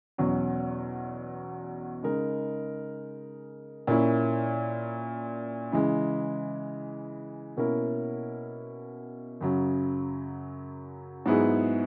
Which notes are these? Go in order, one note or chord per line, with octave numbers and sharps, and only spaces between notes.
E2 B2 F#3 C#4
C#3 G#3 D#4 A#4
A#2 A#3 C#4 E4
C#3 E3 G#3
B2 A#3 C#4 E4 A#4
F#2 C#3 F#3
G#2 F#3 B3 E4 G#4